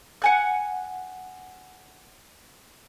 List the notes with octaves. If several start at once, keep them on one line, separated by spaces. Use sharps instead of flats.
F#5 G#5 F#6